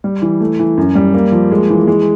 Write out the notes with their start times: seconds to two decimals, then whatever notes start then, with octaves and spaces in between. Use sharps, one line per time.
0.04 G3
0.22 E3
0.40 A3
0.59 E3
0.77 F#2
0.95 G3
1.14 A#3
1.32 F3
1.51 G#3
1.70 E3
1.87 G#3